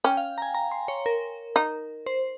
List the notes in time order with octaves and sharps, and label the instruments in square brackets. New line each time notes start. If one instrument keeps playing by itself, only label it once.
[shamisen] C#4 [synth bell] G5
[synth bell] F5
A#5
G#5
A#5
C6
C#5
A#4
[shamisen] D#4
[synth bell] C5